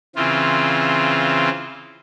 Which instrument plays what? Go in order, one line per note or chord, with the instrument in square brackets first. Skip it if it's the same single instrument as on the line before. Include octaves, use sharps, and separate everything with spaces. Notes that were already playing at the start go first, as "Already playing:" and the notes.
[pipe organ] C#3 E3 C4 F4